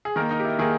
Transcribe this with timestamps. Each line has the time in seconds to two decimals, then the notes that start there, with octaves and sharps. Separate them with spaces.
0.05 G#4
0.16 D#3 A#3 A#4
0.31 D#4
0.40 G4
0.44 E4
0.59 D#3 A#3 G#4